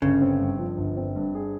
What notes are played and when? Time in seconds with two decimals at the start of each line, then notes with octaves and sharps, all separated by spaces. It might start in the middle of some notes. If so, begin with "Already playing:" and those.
0.02 G1 C#3
0.22 C4
0.40 G2
0.59 F3
0.78 G1
0.97 C4
1.16 G2
1.35 G#4